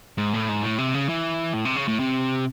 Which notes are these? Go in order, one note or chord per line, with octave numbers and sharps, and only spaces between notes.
G#2
A2
G#2
A2
C3
C#3
E3
A2
C3
C#3
A2
C3